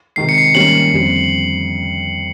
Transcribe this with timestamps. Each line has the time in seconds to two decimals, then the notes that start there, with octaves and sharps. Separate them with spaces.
0.16 C3 D#3 G#3 C7
0.29 C#7
0.38 C7
0.42 C#7
0.55 G#2 D#3 G3 A#3 C#4 F#7
0.92 F2 D3 G3 C4